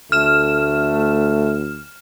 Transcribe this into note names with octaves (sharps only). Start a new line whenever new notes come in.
D2 A3 F6 E7